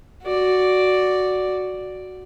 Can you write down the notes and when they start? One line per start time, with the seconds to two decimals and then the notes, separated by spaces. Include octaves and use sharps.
0.22 F#4 D5